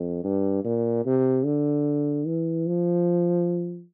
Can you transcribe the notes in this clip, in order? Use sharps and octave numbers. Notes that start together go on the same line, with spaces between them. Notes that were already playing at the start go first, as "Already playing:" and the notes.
Already playing: F2
G2
A#2
C3
D3
E3
F3